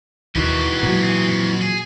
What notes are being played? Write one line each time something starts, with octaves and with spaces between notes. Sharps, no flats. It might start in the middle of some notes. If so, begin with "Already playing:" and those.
D#2 D#3 E3 G#3 F#4 G4
A#2 F#3
C4 G#4
F2
G#4